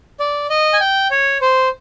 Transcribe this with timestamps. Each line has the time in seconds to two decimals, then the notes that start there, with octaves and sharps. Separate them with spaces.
0.20 D5
0.50 D#5
0.73 G#5
0.80 G5
1.11 C#5
1.41 C5